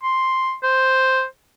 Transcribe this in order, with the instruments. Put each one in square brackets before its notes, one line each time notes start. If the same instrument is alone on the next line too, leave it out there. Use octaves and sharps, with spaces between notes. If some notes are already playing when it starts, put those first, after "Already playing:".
[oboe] C6
C5